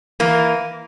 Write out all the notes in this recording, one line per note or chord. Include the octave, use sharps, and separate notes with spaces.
E3 A#3